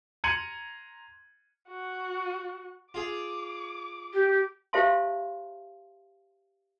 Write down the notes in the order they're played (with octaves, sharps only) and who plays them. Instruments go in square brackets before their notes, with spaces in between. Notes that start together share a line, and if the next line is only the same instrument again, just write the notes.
[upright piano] A#5 C6 G#6 C#7 D#7 F#7
[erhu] F#4
[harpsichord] F4 G#4 [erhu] D6
[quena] G4
[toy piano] G4 C5 E5 F5 A5 C6